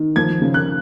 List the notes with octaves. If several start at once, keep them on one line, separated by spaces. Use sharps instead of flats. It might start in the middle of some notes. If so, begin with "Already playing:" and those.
Already playing: D#3
F3 G#6
C#3
F#6